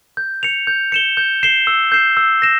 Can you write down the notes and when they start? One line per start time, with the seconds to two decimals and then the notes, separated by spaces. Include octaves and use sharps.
0.17 G6
0.43 C#7 F7
0.67 G6
0.92 C#7 E7 G7
1.17 G6
1.43 C7 E7 G7
1.67 E6
1.92 G6 C7 E7
2.17 E6
2.42 A#6 E7